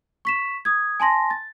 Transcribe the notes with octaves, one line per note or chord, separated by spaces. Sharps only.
C#6 B6 E7
D#6 G#6
G#5 A5 C6 A#6
A6